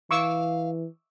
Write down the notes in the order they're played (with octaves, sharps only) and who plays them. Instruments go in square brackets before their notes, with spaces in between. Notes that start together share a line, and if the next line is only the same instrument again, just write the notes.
[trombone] E3 [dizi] F5 [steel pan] C#6 D6 E6